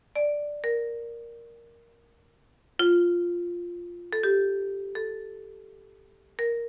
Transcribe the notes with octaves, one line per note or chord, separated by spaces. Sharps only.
D5
A#4
F4
A4
G4
A4
A#4